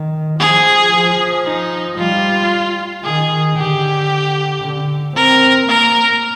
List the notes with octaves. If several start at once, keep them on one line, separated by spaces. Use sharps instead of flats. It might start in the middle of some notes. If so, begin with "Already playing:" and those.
Already playing: D#3
F3 G#4
F3
D#4
G3 F4
D#3 G#4
D3 G4
D3
C4 A#4
A#3 A#4